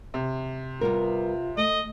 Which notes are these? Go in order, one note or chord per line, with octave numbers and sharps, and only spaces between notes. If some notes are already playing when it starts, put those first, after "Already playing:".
C3
G3 B3 F4 A#4
A3 D#5